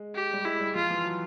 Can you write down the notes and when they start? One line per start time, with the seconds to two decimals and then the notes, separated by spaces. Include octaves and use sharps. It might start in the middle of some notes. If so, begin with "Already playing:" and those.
Already playing: G#3
0.15 G4
0.33 G3
0.45 G#3 E4
0.60 G3
0.75 F3 F4
0.90 E3
1.05 F#3